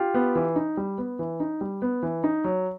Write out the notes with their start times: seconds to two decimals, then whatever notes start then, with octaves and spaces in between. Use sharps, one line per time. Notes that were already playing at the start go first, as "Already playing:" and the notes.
Already playing: F4 G4
0.14 B3
0.35 E3
0.56 D#4
0.77 G3
0.98 B3
1.19 E3
1.40 D#4
1.61 G3
1.82 B3
2.03 E3
2.24 D#4
2.44 F#3